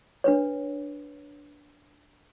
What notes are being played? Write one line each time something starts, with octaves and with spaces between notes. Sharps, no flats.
D4 B4 C#5